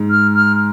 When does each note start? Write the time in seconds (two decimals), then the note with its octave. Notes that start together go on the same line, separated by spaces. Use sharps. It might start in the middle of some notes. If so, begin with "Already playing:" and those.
Already playing: G#2
0.10 F6
0.35 F6